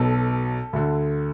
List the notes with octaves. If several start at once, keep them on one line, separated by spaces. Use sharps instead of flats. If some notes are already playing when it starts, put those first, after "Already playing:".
Already playing: B1 B2 A4
D2 D3